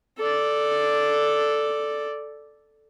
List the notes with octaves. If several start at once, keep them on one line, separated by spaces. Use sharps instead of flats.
A4 D5